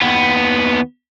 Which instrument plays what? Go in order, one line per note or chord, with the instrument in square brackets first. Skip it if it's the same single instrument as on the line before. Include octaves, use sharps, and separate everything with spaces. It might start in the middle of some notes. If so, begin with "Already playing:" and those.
[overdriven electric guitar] D#2 B3